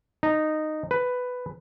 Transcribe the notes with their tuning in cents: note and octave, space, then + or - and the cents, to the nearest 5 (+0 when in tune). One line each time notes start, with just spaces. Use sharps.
D#4 -10
B4 +10